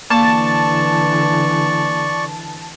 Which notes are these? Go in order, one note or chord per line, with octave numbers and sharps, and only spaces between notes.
D3 E3 A#3 D5 A5 C#6